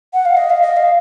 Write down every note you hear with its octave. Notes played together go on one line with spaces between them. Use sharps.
F#5
F5
D#5
F5
D#5
F5